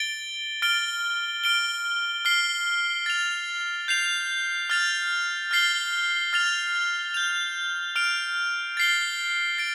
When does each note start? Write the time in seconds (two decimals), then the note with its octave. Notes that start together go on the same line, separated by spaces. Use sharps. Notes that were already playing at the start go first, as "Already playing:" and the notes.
Already playing: A6 D7 G7
0.62 F6 A6 D7 G7
1.44 F6 D7 G7
2.25 F6 C7 G7
3.06 A6 F7
3.88 G6 C7 F7
4.70 F6 A6 F7
5.51 F6 A6 C7 G7
6.33 F6 A6 F7
7.14 G6 F7
7.96 F6 D7 F7
8.77 A6 C7 G7
9.58 A6 D7